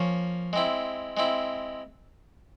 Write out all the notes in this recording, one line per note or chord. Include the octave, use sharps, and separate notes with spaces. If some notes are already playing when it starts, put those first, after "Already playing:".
Already playing: F3 A#3 C#4
G#3 C4 E4
G#3 C4 E4